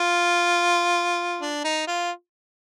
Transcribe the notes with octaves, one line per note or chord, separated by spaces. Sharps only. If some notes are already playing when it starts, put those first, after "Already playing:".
Already playing: F4
D4
D#4
F4